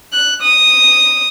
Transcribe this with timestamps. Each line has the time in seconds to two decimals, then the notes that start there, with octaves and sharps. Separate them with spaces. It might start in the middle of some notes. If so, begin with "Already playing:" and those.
0.13 F#6
0.42 D#6